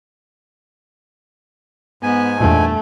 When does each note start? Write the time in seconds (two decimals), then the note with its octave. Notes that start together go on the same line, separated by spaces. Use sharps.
2.03 G#2 B3 G#5
2.40 E2 G2 A#2 A3